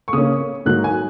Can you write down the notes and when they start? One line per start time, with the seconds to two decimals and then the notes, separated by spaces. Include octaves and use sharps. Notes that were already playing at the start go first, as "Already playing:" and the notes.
0.08 C#6
0.13 C#3 A#3 C#4 D#6
0.65 G#2 F#3 A#3 D#4 F#6
0.84 G#5